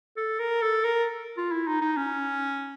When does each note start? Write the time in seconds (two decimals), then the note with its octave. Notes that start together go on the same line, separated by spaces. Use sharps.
0.17 A4
0.40 A#4
0.62 A4
0.84 A#4
1.37 F4
1.52 E4
1.67 D#4
1.81 D#4
1.97 C#4